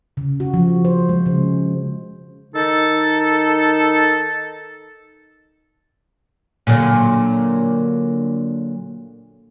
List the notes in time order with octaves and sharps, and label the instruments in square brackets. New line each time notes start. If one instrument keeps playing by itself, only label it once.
[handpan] C#3
F#4
F3
C5
G#3
C#3
[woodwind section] D#3 D#4 A4
[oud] A#2 D3 F#3